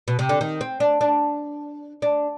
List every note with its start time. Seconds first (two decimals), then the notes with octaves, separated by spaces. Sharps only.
0.08 B2
0.19 C3
0.29 D3
0.41 D#3
0.61 C4
0.80 D4
1.01 D4
2.02 D4